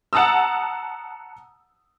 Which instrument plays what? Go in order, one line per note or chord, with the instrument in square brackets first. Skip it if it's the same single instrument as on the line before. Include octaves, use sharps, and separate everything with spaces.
[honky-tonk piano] F#5 A5 A#5 D#6 E6